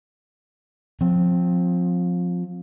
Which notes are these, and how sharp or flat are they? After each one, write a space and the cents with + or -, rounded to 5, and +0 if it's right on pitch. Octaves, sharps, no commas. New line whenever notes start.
F3 +20 C4 +0